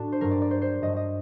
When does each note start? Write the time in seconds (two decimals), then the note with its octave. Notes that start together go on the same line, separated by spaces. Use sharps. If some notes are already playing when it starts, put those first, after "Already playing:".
Already playing: A2 D4 F#4
0.12 C5
0.21 G2 F#3 A#4
0.31 D5
0.42 D5
0.51 C5
0.62 C5
0.82 G2 F#3 D#5
0.96 D#5